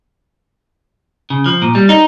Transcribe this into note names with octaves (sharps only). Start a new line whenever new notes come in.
C#3
F3
A#2
G3
D#4